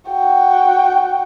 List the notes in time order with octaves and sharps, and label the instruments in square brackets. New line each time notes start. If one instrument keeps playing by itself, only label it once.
[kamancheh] F#4 G5